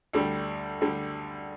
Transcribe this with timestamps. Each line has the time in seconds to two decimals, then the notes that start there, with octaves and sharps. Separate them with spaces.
0.13 D2 D3 G3
0.81 D2 D3 G3